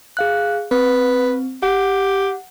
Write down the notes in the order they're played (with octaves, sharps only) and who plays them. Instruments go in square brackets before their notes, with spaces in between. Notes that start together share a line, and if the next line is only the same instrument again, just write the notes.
[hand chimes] G#4 F5 F#6
[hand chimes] C4 [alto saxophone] B4
[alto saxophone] G4 [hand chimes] F#5